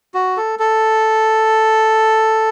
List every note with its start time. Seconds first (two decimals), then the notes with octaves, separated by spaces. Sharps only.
0.14 F#4
0.37 A4
0.59 A4